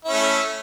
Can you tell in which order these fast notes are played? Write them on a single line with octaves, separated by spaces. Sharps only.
E4 C#4 A3